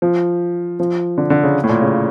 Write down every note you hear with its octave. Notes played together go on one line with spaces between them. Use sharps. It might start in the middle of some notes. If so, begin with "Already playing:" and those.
F3
F3
D3
D3
C#3
A2
A#2
C#3